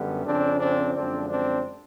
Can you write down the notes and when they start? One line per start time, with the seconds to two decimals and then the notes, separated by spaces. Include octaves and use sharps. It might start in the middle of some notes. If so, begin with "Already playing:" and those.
Already playing: F#2 D3 G3 B3
0.25 F2 C#3 F3 C4 D4
0.60 C4 D4
0.95 F#2 D3 F3 G#3 C4 D4
1.29 C4 D4